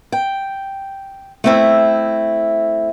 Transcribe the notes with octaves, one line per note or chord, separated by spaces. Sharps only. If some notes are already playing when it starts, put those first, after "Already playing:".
G5
A3 C4 E4